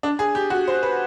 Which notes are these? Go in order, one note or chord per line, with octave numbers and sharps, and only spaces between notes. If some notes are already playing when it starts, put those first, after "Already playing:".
D4
G#4
G4
F#4
C5
B4